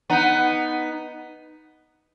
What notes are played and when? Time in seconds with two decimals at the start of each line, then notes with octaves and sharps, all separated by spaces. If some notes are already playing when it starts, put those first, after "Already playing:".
0.10 B3 D#4